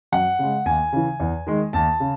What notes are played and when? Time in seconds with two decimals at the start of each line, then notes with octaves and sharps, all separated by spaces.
0.12 F#2 F#5
0.39 C#3 G#3
0.66 D#2 G#5
0.93 C#3 E3
1.20 E2
1.47 D#3 G#3
1.73 D#2 A5
2.00 C#3